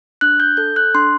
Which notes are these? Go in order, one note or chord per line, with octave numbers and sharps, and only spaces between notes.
D4 F#6
G6
A4 G6
F#6
D4 C6